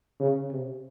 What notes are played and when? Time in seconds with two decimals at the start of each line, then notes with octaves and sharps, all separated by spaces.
0.20 C#3
0.51 C3